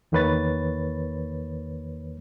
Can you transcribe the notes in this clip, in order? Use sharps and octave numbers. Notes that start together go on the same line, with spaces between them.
E2 D#3 A#3 B4 C#5 A6